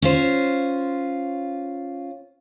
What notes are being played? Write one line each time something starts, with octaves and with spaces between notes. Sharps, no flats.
C#4 F4 C5